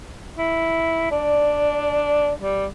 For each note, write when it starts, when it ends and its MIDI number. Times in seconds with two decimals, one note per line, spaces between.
0.37 1.07 64
1.12 2.33 62
1.12 2.33 74
2.40 2.66 55